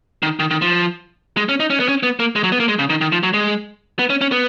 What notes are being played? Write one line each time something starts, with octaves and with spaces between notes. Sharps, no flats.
D#3
D#3
D#3
F3
G#3
C#4
D#4
C#4
B3
C#4
B3
A#3
G#3
F#3
B3
A#3
G#3
C#3
D#3
D#3
F3
F#3
G#3
B3
C#4
C#4
B3